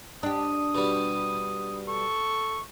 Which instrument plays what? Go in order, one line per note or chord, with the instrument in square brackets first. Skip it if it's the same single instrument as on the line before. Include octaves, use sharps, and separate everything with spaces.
[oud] D4 G4 [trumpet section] D#6
[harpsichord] B2 G3
[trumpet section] A4 C#6